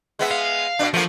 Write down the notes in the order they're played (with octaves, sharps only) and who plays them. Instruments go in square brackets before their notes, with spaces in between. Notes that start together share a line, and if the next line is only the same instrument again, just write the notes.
[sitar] G#3 B3 E5
[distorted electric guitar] F5
[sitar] B2 D4
[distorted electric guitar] F3 [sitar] A3 A#3